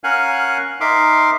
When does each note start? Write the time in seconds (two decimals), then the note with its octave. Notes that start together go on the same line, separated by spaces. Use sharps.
0.04 C#4 A#4 F5 F#5 G#5 F#6
0.81 D#4 A#4 E5 C6 D6